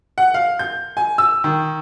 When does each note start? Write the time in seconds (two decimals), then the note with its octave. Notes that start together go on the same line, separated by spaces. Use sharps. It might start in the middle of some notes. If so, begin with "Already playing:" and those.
0.18 F#5
0.34 F5
0.59 G6
0.97 G#5
1.18 E6
1.44 D#3